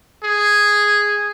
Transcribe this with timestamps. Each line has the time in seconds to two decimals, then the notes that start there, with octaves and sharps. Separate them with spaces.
0.24 G#4